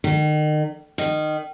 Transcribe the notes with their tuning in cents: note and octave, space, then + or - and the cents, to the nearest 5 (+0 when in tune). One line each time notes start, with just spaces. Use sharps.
D#3 -35
D#3 -20